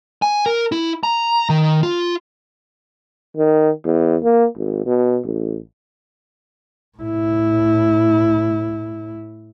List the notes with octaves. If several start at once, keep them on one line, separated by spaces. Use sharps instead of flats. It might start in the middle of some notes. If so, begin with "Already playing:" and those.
G#5
A#4
E4
A#5
D#3
F4
D#3
E2
A#3
G#1
B2
A1
A2 E4